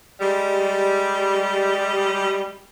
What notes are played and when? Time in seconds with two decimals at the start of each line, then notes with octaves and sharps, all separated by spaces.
0.20 G3 G#3